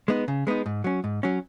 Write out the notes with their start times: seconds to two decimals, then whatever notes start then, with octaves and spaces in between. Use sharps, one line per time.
0.08 G#3 B3 D#4
0.28 C#3
0.47 G#3 B3 D#4
0.66 G#2
0.84 F#3 C#4
1.04 G#2
1.23 F#3 C#4